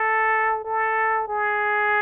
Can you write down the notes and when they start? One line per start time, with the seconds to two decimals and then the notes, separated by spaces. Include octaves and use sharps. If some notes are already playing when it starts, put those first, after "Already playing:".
Already playing: A4
0.65 A4
1.28 G#4